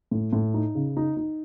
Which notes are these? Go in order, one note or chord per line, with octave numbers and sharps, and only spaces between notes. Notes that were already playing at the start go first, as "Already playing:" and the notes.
A2
A2
D#4
C#3
D#4
D#4